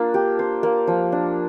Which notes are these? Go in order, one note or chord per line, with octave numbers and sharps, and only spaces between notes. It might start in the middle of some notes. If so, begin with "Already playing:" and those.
Already playing: A#3 D4 F4
G4
C5
A#3
F3
D4